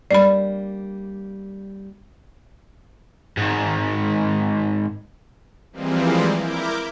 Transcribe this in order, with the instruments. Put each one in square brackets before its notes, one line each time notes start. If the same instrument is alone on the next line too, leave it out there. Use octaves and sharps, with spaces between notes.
[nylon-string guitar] G3 A#3 D4 [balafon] D5 B5
[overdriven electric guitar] G#2 D#3
[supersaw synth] E3 F3 G3 G#3 A#3 C4
E4 A#4 D6 G6